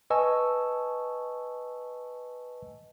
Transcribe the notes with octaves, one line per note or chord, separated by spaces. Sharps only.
B4 D#5 G#5 A5 C#6 E6